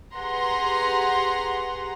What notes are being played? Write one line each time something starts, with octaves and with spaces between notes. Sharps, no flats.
G4 G#4 B4 F#5 A#5 C6